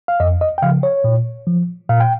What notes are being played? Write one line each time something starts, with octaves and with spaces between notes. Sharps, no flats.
F5
F2 D#5
D#5
G5
C#3 F3 F5
C#5
A#2
F3
A#2 F5
G5